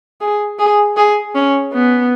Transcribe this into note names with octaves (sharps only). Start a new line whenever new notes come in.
G#4
G#4
G#4
C#4
B3